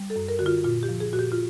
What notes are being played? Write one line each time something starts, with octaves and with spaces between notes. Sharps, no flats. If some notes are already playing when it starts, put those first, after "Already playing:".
Already playing: G3
A4
F#2
A#4
D3 F#4
F4
A#2 F4
G4
F3
G#4
A#2 F#4
G4
F4